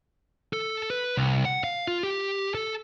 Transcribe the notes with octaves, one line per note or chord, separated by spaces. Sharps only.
A4
B4
C2
F#5
F5
F4
G4
A4